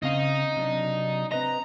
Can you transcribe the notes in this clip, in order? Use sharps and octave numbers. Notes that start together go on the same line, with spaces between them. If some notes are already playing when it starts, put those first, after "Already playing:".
C#3 C4 D#4 F5
C3 F#3 D4
C4 B4 D#5 A#5